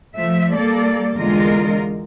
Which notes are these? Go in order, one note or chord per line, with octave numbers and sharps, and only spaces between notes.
F3 A3 E5
G3 A#3 A4 D5
E2 D3 G#3 F4 A#4 D#5